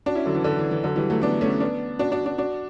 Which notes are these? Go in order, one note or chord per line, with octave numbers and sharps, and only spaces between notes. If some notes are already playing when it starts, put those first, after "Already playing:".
D4 F#4
C#4 E4
D3 F#3
E3
D3
E3
E3
D3 F#3
E3 G3
F#3 A3
B3 D4
A3 C#4
B3 D4
D4 F#4
D4 F#4
D4 F#4
D4 F#4